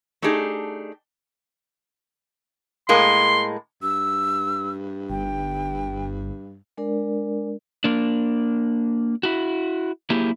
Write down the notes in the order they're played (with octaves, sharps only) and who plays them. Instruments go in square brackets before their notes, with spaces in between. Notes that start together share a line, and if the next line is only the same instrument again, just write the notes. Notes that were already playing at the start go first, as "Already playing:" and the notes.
[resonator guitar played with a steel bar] A3 D4 D#4 G4 G#4
[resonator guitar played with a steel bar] A2 G#3 A#3 [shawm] C6
[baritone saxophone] G2 [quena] E6
[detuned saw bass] G1 [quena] G5
[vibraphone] G#3 D4 A#4 D5
[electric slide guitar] A#3 D4
E4 F#4
F#3 A#3 E4 G4 G#4